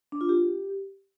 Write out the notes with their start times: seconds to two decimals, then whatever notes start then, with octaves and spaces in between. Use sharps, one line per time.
0.12 D4
0.21 F4
0.29 G4